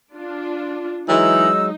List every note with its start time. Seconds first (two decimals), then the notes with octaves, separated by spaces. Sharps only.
0.15 D4 F4
1.09 E3 F#3 G#3 D#4 E6